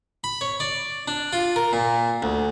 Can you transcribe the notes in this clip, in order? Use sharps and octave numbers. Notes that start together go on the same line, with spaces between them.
B5
C#5
D5
D4
F4
A#4
A#2
D2